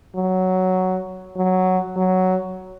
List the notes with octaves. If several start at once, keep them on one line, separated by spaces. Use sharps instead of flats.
F#3
F#3
F#3